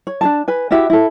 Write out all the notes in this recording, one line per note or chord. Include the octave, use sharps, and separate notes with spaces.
C#5
D4 G#4 A5
B4 G#5
E4 F#4 G4 E5
E4 A4